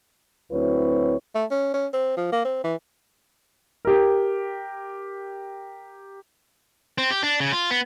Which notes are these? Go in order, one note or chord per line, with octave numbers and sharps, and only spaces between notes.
D2 F#3 C4 E4 B4 C#5
A3
C#4
C#4
C4
F3
A#3
C4
E3
G4 A#4
C4
G4
D4
C#3
F4
B3